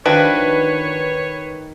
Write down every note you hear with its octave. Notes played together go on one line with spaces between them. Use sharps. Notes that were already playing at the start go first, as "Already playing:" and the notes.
D#3 F3 D4 F#4 B4 C#5